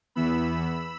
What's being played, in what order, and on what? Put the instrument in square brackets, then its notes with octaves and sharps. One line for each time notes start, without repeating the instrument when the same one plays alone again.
[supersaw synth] E2 E3 B3 B5 E6